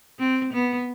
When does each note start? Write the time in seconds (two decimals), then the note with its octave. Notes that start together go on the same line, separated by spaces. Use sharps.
0.19 C4
0.53 B3